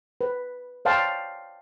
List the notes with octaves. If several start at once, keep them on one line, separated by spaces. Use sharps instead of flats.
B4
C#5 D5 F5 G5 A5 C6